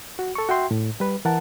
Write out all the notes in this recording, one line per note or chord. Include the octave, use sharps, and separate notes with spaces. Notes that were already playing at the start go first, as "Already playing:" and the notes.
F#4
A4 C#6
F#4 E5 G5 C6
A2
G3 B4
E3 A#4 F#5 A5